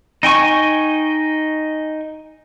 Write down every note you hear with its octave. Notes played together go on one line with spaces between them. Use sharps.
D#4 G5 G#5 C#6